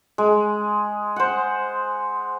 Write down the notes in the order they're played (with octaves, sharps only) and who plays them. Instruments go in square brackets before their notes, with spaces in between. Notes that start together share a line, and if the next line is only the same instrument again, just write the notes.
[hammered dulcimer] G#3
C5 F#5